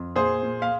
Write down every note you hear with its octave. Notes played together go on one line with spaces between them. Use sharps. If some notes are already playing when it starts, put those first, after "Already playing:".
Already playing: F2
A#2 G#4 C5
A#2
F5